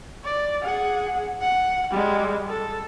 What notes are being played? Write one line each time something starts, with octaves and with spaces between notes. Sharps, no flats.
D5
G#4 F#5
F#5
G3 G#3
A4